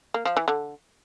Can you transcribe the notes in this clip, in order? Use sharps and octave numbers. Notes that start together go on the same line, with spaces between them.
A#3
F3
E3
D3